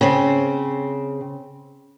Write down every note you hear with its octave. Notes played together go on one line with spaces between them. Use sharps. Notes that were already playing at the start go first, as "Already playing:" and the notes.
C#3 C4